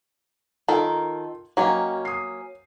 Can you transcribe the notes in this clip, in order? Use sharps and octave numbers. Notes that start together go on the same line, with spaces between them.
D#3 F4 A4 A#4
F#3 A#3 C#4 F#4 D#5 G5
D#6 C7